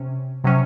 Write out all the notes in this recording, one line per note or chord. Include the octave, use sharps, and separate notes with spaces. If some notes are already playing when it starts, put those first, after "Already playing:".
Already playing: C3 C#4
C3 F#3 C#4